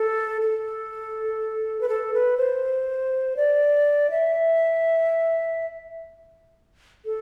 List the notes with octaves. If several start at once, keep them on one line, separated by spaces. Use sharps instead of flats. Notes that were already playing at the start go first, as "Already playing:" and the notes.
Already playing: A4
A4
B4
A4
B4
C5
D5
E5
A4